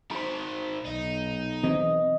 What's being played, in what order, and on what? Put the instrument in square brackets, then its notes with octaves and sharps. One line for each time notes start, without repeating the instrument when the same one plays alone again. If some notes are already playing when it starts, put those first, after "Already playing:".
[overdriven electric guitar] D#3 C5 [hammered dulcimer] B5
[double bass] B1 [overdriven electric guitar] D#4
[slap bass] E3 C4 [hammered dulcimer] D#5